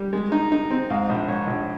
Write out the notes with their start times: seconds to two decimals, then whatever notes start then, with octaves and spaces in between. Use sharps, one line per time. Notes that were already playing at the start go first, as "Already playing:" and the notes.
Already playing: G3
0.13 G#3
0.32 D#4
0.52 D#4
0.71 C4
0.90 G#2 F5
1.09 A#1
1.28 G#2 C#5
1.47 A#1